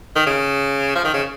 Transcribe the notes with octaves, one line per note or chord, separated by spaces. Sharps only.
D#3
C#3
F3
D#3
C#3